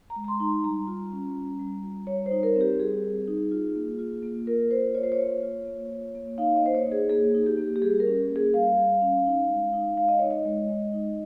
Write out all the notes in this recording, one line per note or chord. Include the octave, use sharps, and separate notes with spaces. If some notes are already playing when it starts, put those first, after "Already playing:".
A#5
G#3
A#5
C6
D#4
G3 A#5
F4
C#4
G3
G3
F4
G3 C#5
C5
D#4
A#4
C4
G4
G3 G#4
G3
D#4
F4
A#3
F4
A#3
F4 A#4
A#3 C5
F4 C#5
C5
C#5
A#3
F4
A#3
F4
A#3
D#4 F5
D#5
A#3 C5
C#5
D#4
G#4
A#3 G#4
D#4
G4
A#3
G4
G3 G#4
A#4
C#4
A#3
G#4
G3 F5
G3
C#4
D#4
G#3
D#4
G#3 F5
D#5
D#4 C#5
D#5
G#3
G#3
D#4